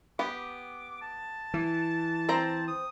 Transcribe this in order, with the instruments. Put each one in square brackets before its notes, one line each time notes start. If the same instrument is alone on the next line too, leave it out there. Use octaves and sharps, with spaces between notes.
[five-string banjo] B3 G4 [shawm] D6
[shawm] A5
[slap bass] E3
[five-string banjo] C4 C5 A#5
[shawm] D#6